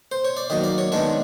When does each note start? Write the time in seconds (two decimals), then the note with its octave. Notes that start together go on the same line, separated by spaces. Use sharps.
0.12 C5
0.25 C#5
0.37 D5
0.50 D#3 F#3 A#3 D#5
0.64 D5
0.78 C#5
0.92 D#3 G#3 B3 D4 C#5